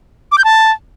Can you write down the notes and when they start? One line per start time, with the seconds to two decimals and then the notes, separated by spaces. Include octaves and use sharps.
0.32 D6
0.38 G6
0.44 A5